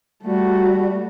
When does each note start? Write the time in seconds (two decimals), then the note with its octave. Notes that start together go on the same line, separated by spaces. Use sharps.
0.23 G3 A3 F#4